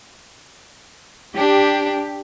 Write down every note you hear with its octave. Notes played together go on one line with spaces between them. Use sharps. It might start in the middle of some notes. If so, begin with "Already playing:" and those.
D4 G4